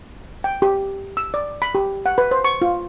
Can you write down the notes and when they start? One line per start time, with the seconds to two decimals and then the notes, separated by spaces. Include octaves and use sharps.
0.44 G5
0.62 G4
1.17 E6
1.34 D5
1.62 B5
1.75 G4
2.06 F#5
2.18 B4
2.31 C5
2.44 C#6
2.62 F4